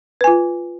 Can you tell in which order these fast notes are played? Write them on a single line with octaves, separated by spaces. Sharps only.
B4 G#5 F4